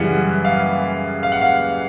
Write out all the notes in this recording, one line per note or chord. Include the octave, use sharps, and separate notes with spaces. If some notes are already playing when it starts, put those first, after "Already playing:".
Already playing: F#2 C#3 E3 G3 F#5
F5
F5
F#5
F5